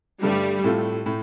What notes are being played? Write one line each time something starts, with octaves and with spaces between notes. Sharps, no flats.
G2 D3 G3 A3
A2 A3 C4 F4 A4
A2 A3